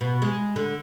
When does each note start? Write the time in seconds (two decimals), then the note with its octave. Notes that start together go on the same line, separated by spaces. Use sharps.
0.01 B2
0.22 G#3
0.56 D3